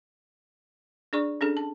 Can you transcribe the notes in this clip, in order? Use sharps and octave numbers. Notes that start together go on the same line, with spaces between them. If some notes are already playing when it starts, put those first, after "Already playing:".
D4 G#4 D5 C#6
C#4 D4 G#4 A4
A5